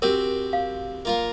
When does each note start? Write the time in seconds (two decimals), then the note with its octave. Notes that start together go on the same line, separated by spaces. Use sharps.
0.02 C4 F#4 G4 A#4
0.53 F5
1.05 A#3 F4 A#4